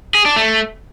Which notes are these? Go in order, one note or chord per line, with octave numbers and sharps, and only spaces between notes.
G#4
D4
A3